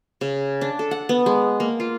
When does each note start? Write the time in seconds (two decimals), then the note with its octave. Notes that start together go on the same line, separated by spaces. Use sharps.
0.21 C#3
0.61 D4
0.79 A4
0.91 F#5
1.09 B3
1.26 G#3
1.60 A#3
1.80 F4